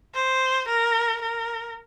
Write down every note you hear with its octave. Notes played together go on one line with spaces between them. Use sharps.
C5
A#4
A#4